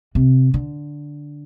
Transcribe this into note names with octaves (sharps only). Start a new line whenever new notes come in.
C3
D3